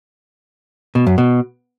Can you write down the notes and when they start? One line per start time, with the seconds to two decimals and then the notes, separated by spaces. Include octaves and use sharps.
0.95 B2
1.07 F#2
1.18 B2